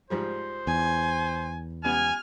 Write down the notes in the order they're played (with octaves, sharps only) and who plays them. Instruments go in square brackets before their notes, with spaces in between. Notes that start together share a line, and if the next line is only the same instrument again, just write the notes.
[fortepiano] G#2 F3 G3 [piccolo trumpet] C5
[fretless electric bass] E2 [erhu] G#5
[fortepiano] C#2 G3 B3 [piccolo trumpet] G#5 [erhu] F6